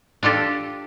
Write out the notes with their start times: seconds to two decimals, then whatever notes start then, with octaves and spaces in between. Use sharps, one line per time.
0.23 D4 F4 G4 A4